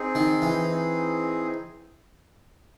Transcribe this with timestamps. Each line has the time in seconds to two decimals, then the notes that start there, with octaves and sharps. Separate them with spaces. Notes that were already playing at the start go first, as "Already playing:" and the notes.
Already playing: C4 D#4 G#4
0.15 D#3
0.42 E3
0.68 C4 D#4 G#4